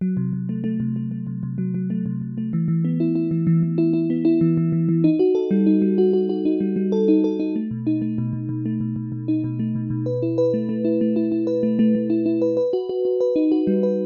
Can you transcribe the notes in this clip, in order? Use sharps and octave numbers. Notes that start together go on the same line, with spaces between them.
F#3
C3
C3
A3
A3
C3
A3
A3
C3
C3
F#3
F#3
A3
C3
C3
A3
E3
E3
B3
E4
E4
E3
E3
E3
E4
E4
B3
E4
E3
E3
E3
E3
D#4
F#4
A4
G3
D#4
G3
F#4
F#4
F#4
D#4
G3
G3
A4
D#4
A4
D#4
A3
B2
D#4
A3
B2
B2
B2
A3
B2
B2
B2
D#4
B2
A3
B2
B2
B4
E4
B4
A3
A3
E4
A3
E4
E4
B4
A3
A3
A3
E4
E4
B4
B4
F#4
F#4
F#4
B4
D#4
F#4
G3
B4